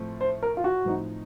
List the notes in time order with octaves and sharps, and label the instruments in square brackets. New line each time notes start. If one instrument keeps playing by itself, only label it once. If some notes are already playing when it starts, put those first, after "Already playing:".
Already playing: [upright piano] A2 F3 A3 C4
[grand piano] C5
A#4
F4
F#4
[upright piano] A2 F3 C4 D#4